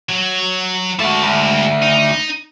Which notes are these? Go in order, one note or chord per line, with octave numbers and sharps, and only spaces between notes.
F#3
G#2 A3 F#4 A5
D2
D#4